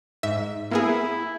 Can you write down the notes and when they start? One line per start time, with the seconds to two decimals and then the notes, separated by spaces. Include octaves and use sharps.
0.23 G#2 E5
0.71 A#3 B3 E4 G#4